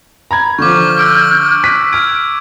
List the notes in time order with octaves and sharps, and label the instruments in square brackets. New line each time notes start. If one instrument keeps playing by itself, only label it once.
[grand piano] A#5 B5 G#6
[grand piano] D3 F3 [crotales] C#6 D6 [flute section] F6 G6
[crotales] D6 E6 D7
[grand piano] F#6 B6 D#7
[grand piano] F6 D7 [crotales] G#6